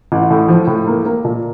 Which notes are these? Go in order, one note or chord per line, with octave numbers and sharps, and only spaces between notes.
A1
A2
F3
A2
A#3
A#3
A#2